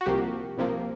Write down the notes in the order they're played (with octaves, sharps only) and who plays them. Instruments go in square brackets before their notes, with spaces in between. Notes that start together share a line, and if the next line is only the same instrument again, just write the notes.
[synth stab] F#4
C2 C3 F3 A#3 G4
C2 C3 F3 A#3